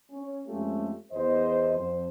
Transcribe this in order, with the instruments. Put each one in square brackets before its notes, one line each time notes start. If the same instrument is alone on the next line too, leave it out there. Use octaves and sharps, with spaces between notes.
[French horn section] C#4
F2 G#3 A3 C#4 F4 G4
E2 C5 D#5
F2 C5